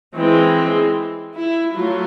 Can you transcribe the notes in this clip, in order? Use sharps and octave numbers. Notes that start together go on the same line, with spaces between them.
E3 G#3 C4
E4
F#3 A3 F4